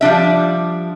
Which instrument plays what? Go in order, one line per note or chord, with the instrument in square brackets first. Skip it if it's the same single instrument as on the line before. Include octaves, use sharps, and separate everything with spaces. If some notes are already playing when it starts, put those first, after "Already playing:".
[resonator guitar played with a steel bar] F3 G3 D4 E5